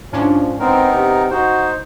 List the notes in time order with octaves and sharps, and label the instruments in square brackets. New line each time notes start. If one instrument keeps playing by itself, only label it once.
[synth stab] G#2 C#4 D4 [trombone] F3
[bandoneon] B3 D#4 A#4 [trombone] C4
[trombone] C3
[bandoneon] D#4 C5 [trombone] F#4